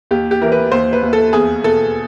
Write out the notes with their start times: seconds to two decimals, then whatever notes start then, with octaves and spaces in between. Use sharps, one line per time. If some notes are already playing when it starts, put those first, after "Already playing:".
0.11 D#2 G4
0.31 G4
0.41 E3 A#4
0.52 B4
0.72 D#2 C5
0.93 B4
1.03 D#2
1.13 A4
1.33 E2 G#4
1.64 B2 A4